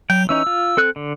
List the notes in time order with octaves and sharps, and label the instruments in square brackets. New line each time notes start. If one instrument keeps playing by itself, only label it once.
[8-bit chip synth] F#3 [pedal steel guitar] G5
[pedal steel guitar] E3 C#4 D#4 [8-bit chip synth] E6
[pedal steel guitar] F4
C4 A4 F#6
D3